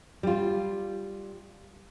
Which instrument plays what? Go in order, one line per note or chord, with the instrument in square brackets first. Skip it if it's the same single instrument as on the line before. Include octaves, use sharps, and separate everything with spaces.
[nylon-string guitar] G3 F4